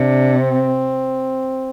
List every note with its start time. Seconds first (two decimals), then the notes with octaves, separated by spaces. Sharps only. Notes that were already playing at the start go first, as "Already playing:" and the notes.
Already playing: C3 D4
0.40 C4